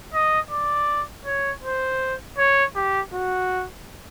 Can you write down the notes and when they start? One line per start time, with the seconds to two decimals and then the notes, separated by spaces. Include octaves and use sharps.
0.14 D#5
0.51 D5
1.26 C#5
1.63 C5
2.38 C#5
2.75 G4
3.13 F#4